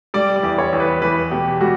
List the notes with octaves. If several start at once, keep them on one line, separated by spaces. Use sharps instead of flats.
G3 D5
D5
E2
C#5
E2
B4
E2 B4
B2 G4
G3 F#4